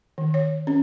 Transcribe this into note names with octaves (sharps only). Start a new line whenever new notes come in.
D#3
C#5
C#4